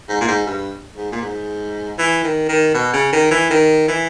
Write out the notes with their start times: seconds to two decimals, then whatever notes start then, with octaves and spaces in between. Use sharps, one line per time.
0.09 G#2
0.21 A#2
0.28 G#2
0.46 G2
0.97 G#2
1.12 A#2
1.22 G#2
1.98 E3
2.24 D#3
2.49 D#3
2.74 B2
2.93 C#3
3.12 D#3
3.31 E3
3.51 D#3
3.88 E3